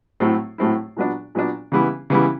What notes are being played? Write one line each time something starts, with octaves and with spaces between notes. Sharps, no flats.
A2 F#3 A3 C4 E4
A2 F#3 A3 C4 E4
A#2 F#3 B3 D4
A#2 F#3 B3 D4
C#3 E3 G3 B3 E4
C#3 E3 G3 B3 E4